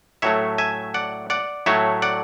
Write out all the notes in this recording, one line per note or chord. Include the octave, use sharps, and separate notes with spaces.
A2 F#3 A3 C#5 E5
E5 G#5
D5 F#5
D5 F#5
A2 F#3 A3 C#5 E5
D5 F#5